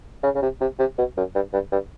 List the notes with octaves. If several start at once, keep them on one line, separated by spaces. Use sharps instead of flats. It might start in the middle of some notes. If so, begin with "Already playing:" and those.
C#3
C#3
C3
C3
C3
B2
F#2
G2
G2
G2